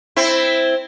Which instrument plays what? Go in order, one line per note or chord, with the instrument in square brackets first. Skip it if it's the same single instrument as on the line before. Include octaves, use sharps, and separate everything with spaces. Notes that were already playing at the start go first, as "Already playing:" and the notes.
[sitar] C4 E4